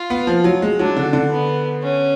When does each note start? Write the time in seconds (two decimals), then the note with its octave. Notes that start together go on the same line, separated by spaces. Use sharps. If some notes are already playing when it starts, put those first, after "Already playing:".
Already playing: F4
0.10 B3
0.27 F3
0.44 F#3
0.62 G#3
0.79 F#3 D4
0.97 D3
1.13 D3
1.31 B3
1.83 C#4